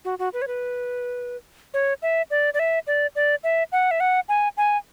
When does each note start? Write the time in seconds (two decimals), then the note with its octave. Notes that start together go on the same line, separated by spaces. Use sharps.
0.05 F#4
0.19 F#4
0.33 B4
0.42 C#5
0.47 B4
1.74 C#5
2.02 E5
2.30 D5
2.54 D5
2.59 E5
2.87 D5
3.15 D5
3.44 E5
3.72 F#5
3.91 E5
4.00 F#5
4.29 G#5
4.57 G#5